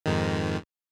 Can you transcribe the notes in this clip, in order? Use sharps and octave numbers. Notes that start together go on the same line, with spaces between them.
F2 G#2 D#3